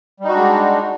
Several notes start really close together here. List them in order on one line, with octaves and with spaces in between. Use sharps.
G3 D#4 F#4 D4 G#3